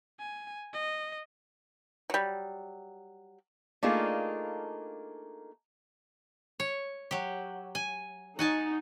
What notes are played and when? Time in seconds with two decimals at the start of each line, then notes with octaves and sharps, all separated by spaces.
0.20 G#5
0.73 D#5
2.10 F#3 G3
3.83 A3 A#3 D4 D#4 F4 G#4
6.60 C#5
7.11 F#3 G4
7.75 G#5
8.39 D#4 F#4 G#5 A5